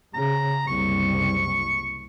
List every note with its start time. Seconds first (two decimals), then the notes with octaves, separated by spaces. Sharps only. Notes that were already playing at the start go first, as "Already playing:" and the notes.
0.14 C#3 A#5
0.67 F#1 C2 C#6